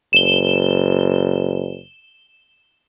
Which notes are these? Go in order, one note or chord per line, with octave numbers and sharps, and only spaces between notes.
F#1 E7 G7